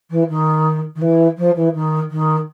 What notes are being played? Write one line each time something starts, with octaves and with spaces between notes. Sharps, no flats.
E3
D#3
D#3
E3
F3
E3
D#3
D#3